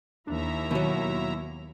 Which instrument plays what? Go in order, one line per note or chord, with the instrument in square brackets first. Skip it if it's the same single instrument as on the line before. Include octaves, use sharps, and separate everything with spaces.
[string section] D#2 [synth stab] D4 [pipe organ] E4 E5 A#5
[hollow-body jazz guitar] B2 F#3 [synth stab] D#3